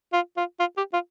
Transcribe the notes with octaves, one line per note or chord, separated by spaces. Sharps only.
F4
F4
F4
G4
F4